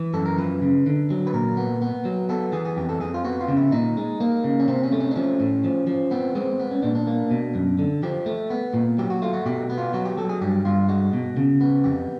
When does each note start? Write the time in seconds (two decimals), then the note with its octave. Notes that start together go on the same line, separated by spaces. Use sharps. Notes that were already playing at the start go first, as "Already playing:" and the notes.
Already playing: E3
0.14 F#2 A4
0.26 A#4
0.38 F3 B4
0.62 C#3
0.86 D3
1.10 F#3
1.27 B4
1.34 A#2 A#4
1.57 B3
1.82 B3
2.05 F#3
2.29 B3 A4
2.53 E3 G#4
2.65 G#4
2.77 F2 G4
2.89 A4
3.00 F2 G#4
3.14 F4
3.24 B3 F#4
3.41 F4
3.48 C#3
3.57 E4
3.72 A#2 D#4
3.97 G#3
4.20 A#3
4.44 C#3
4.60 C#4
4.68 C3 C4
4.83 C#4
4.92 A3
5.00 C#4
5.11 D4
5.16 F3 C#4
5.40 A2
5.64 F3
5.87 F3
6.11 B3 C4
6.35 G#3 C4
6.59 B3
6.71 C#4
6.82 A#2 D4
6.95 D4
7.07 A#3
7.31 B2
7.55 F#2
7.79 D3
8.03 F3 G4
8.26 A3
8.50 B3
8.74 A#2
8.98 F#3 G4
9.10 F#4
9.22 A3 F4
9.33 F#4
9.46 B2 G4
9.70 B3
9.78 F4
9.93 F#3 F#4
10.05 G4
10.18 F#3 A4
10.29 G#4
10.41 G2 G4
10.65 G2 F4
10.89 G#3 F#4
11.13 B2
11.37 C#3
11.61 B3
11.84 F2 G4